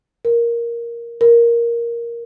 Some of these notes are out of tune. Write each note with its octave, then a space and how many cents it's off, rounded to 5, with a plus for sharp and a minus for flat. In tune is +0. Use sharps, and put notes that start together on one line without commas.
A#4 +5
A#4 +5